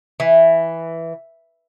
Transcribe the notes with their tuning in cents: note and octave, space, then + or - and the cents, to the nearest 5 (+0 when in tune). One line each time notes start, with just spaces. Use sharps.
E3 +0